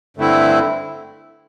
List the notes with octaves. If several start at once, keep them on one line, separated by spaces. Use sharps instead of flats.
G2 D3 A3 C4 E4